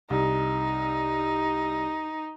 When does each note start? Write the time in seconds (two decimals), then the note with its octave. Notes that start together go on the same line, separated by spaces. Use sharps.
0.10 C2 D#4